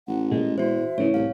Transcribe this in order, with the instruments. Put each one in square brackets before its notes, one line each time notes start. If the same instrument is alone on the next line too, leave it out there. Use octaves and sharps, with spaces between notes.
[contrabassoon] A1 [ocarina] F#5
[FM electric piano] A#2 G#3 [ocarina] D#5
[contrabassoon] E2 [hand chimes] F#4 C5 [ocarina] E5
[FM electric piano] A2 E3 [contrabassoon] C#3 [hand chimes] C#5
[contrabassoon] C2 [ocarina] C#5 [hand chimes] F5